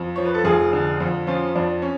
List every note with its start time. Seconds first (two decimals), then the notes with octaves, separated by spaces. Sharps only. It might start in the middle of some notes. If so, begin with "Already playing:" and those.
Already playing: F2
0.16 F3 C#5
0.25 B4
0.34 A4
0.44 F1 F4 G#4
0.73 D3
1.00 F2
1.27 F3 C#4 F4
1.55 F2 D4
1.82 C#4